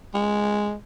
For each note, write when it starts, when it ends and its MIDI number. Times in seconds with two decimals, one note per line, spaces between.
0.14 0.74 56